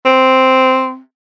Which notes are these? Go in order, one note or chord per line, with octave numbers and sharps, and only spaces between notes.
C4